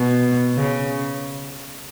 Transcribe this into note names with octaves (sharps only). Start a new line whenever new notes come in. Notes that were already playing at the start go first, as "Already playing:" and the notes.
Already playing: B2
C#3